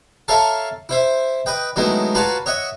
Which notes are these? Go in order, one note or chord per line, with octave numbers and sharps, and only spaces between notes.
A4 A#4 C#5 E5 F5 A5
E4 C5 E5
B4 D#5 G5
D#3 F#3 G#3 A3 B3 E4
F4 F#4 B4 C#5 A5 A#5
C#5 D#5 E5 F#5